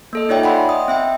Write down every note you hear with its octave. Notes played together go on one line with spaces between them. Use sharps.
A#3 A4 D#5
D#4 F4 C#5 D5 E5 G5
F#5 G#5 B5 C6
D#5 D#6
C4 E5 G5